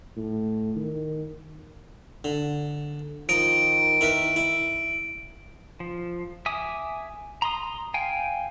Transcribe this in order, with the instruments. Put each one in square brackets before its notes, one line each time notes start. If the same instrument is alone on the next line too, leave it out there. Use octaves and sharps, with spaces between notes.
[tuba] A2
D#3
[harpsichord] D3
[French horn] D#3 [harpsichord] F3 A#5 D#6 [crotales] D7
[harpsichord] E4 A#4 B4
E4
[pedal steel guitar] F3
E5 G#5 D6 D#6
A#5 C6 D#6
F5 G5 G#5